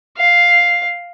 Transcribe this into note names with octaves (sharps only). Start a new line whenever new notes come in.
F5